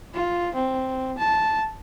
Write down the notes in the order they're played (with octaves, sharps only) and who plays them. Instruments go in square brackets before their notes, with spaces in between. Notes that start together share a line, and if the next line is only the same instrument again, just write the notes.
[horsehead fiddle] F4
C4
A5